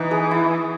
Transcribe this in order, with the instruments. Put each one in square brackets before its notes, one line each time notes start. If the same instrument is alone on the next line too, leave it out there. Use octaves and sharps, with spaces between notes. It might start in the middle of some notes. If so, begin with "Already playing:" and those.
Already playing: [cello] E3 [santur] B3 D#4
[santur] G#4
E4